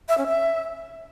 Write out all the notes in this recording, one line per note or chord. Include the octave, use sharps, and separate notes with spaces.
E5
C#4
E5